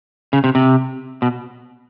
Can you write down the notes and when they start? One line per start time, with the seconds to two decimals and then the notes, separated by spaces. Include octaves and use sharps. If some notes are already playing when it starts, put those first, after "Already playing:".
0.33 C#3
0.44 C3
0.55 C3
1.22 B2